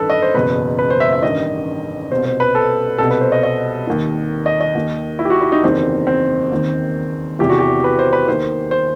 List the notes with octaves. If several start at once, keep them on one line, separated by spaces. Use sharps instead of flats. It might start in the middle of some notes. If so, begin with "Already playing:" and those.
Already playing: A1 G2 D#3 A4 B4
D#5
C5
F#1 E2 B2 B4
B4
C5
E5
E5
A1 G2 D#3 D#5
C2 B2 C5
C5
B4
A4
C2 B2 A4
B4
C5
D#5
D#5
D#2 D#3
D#5
D#5
D#2 D#3
E4
G4
F#4
E4
D#4
F#1 E2 D#3 C4
C4
D#2 D#3
E1 E2 C3 E3 G4
F#4
G4
B4
C5
B4
D#2 D#3 C5
C5